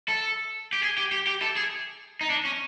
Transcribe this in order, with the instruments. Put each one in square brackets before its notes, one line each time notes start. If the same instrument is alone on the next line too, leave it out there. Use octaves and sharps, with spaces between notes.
[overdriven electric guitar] A4
G4
G#4
G4
G4
G4
A4
G#4
D#4
D4
C#4